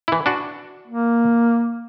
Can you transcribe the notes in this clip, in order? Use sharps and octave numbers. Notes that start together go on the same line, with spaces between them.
E3 E4
D4 F#4
A#3